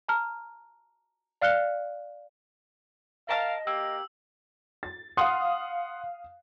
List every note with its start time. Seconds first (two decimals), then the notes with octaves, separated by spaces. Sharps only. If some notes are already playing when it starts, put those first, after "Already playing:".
0.08 A5 A#5 F6
1.41 D5 F5 F6 F#6 C#7 G7
3.29 A#4 D#5 F5 A5 F6
3.67 A#3 G4 E6
4.83 A6
5.17 F5 F#5 C6 D#6